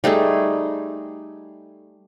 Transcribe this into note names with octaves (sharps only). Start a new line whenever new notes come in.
G3 A3 D#4 G#4